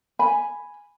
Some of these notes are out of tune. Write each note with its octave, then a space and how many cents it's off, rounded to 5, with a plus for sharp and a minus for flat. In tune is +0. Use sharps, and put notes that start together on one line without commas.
G#5 +0 B5 +0